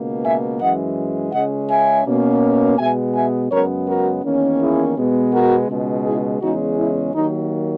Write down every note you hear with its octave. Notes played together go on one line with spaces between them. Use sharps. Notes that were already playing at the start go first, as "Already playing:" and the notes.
Already playing: C#2 B2 A#3
E5 G#5
F#2 E3 G#3 D#5 F#5
C#2 C#3 G#3 C#4 D#5 F#5
E5 G#5
B2 A#3 C#4
B2 G#3 B3 E5 G#5
E5 G#5
F#2 C#3 G#3 B3 A#4 C#5
F#4 A#4
E2 D#3 A#3 C#4
E4 G#4
B2 G#3 B3
F#4 A#4
C#2 B2 G#3
E4 G#4
E2 C#3 G#3 C#4 D#4 F#4
E4
D#2 D#3 F#3 A#3 D#4